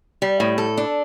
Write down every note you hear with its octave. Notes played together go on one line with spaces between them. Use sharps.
G3
A2
A4
D4